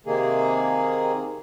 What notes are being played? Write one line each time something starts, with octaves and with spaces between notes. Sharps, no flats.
C3 D#3 A#3 G#4